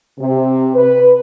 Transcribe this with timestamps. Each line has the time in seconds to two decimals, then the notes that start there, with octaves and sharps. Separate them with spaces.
0.19 C3
0.75 B4